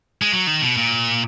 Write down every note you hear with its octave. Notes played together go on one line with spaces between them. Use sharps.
G#3
F#3
D#3
B2
A#2